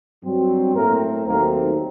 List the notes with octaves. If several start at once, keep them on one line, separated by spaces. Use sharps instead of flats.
G2 F#3 C4
A2 A3 A#3 C4 A#4
D#2 D#3 F#3 A3 A#3 C4 A#4